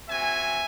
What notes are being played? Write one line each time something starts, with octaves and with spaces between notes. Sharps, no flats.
C4 F#4 E5 G#5